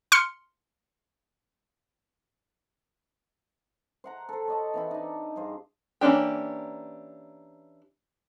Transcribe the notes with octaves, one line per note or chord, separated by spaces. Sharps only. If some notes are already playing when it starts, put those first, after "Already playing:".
C6 F6 C#7
C5 F#5 A#5
A4 C5
C#5 D#5 A5
E3 C4 E4
D4 D#4
G2 G#4 C5 F5
E3 A#3 C#4 D4 G4